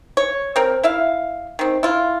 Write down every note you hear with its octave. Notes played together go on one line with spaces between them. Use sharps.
C#5
C4 A#4
E4 E5 F5
D#3 C4
E4 F4